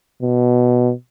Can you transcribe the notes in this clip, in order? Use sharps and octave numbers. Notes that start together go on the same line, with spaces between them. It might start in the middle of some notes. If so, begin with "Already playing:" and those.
B2